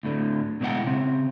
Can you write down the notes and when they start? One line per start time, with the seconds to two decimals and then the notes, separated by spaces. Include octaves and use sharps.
0.03 D2 A2 D3
0.61 B2 G#3 E4 D5 F#5 G5
0.86 C#3 C4